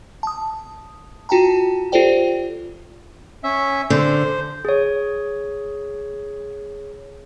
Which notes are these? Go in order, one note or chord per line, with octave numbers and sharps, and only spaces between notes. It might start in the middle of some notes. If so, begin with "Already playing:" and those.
A5 D#6
F4 F#4 G5 A5 A#5
F4 G4 A4 C5 D5 G5
C#4 E5
D3 C5
G#4 C#5